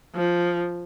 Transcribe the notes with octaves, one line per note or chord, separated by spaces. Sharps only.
F3